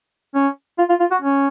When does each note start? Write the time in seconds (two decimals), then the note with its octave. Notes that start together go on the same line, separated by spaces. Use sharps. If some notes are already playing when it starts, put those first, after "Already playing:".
0.34 C#4
0.78 F4
0.89 F4
1.00 F4
1.11 F#4
1.22 C#4